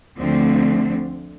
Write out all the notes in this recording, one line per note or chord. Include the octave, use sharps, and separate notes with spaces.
D2 D3 F3 A3 C4